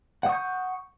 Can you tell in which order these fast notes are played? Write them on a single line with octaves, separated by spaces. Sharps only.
F#5 D#6 C#6 G6